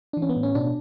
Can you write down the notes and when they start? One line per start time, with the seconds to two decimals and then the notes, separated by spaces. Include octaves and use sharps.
0.13 D4
0.17 E3
0.22 C#4
0.29 B3
0.36 A2
0.43 C#4
0.55 B2 D4